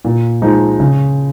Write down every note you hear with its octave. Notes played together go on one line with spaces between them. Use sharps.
A#2
F3 G#3 D#4
C#3